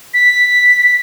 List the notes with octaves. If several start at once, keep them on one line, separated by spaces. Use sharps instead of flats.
B6